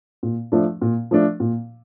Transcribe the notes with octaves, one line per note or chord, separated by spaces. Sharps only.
A#2
F3 A3 D4
A#2
F3 A3 D4
A#2